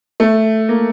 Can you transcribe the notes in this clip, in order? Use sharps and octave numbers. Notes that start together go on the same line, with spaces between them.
A3
A#3